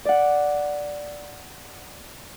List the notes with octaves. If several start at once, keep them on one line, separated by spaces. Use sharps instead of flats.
D5 F#5